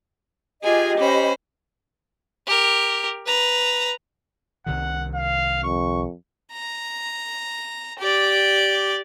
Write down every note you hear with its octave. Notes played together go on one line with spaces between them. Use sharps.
F4 G4 G#4 D#5 G#5
C#4 C5 B5
G4 A#4
B4 A#5
C2 C3 D#3 F#5
F5
F2 C#6
A#5
G4 D5